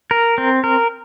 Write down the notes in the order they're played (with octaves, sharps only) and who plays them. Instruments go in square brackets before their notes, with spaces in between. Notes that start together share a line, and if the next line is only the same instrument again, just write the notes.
[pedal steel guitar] A#4
C4
A#4